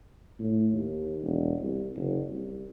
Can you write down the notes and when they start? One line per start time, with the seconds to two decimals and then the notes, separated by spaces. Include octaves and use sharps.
0.39 A2
0.73 D#2
1.22 E1
1.60 C2
1.96 F#1
2.28 C2